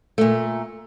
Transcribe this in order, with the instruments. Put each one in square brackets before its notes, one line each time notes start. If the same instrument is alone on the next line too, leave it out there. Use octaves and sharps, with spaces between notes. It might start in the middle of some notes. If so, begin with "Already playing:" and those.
[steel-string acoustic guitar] A#2 A3